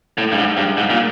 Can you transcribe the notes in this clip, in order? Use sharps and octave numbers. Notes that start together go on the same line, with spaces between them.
A2
G2
G#2
G2
G#2
A#2